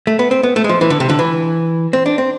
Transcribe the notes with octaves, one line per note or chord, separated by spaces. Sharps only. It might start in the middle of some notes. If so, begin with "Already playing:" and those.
A3
B3
C4
B3
A3
G#3
F3
E3
D3
C3
D3
E3
C4
D4
C4